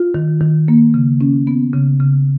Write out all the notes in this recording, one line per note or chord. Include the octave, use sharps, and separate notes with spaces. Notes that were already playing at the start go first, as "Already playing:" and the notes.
Already playing: F4
D#3
D#3
A#3
C#3
C#4
B3
C#3
C#3